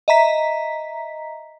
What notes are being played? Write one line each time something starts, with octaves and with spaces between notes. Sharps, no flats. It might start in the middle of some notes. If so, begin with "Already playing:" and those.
D#5 E5 A#5 B6